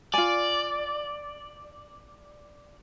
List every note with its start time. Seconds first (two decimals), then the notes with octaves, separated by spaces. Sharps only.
0.14 F4 D5 G#5